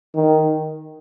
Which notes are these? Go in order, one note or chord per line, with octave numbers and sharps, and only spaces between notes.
D#3